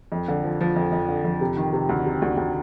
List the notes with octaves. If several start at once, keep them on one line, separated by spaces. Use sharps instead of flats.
F2
D3
F3
F3
F2
F2
D3
F2
C3
D#3
C3
D2
C3
D2
D2